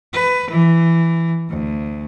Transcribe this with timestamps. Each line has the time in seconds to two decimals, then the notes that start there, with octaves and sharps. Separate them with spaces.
0.13 B4
0.50 E3
1.50 D2